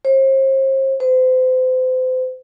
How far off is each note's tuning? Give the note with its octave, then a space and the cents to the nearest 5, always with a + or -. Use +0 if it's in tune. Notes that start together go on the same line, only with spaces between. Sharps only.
C5 +40
C5 -35